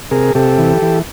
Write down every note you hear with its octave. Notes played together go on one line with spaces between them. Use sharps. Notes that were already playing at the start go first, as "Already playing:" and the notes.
C3 G#4 A#4
C3 G4 A4
E3
E3